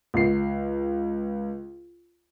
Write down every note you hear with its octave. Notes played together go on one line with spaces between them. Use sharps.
C#2 C7